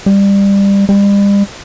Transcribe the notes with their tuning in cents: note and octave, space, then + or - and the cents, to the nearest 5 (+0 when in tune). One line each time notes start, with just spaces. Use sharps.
G3 +20
G3 +40